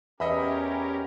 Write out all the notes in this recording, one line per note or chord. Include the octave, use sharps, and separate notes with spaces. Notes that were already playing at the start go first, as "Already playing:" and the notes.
E2 C#4 G4 A#4 D#5 E5 B5